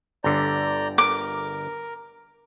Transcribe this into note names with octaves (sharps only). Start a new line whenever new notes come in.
G1 D3 D5 A#5 G6
A#4 D6